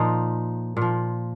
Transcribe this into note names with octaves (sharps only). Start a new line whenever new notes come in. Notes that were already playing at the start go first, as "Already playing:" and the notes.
Already playing: A#2 F3 D#4
A#2 F3